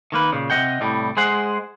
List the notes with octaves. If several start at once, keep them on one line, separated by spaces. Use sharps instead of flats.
D#3 A#3 B4
A#2 C#3
C3 F#3 D#5 F#5 G5
C2 A2 G3
G#3 G#4 C5 F#5